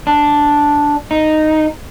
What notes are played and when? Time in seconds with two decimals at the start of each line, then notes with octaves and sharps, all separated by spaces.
0.07 D4
1.11 D#4